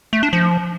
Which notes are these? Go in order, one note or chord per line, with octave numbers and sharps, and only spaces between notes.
A3
D4
F3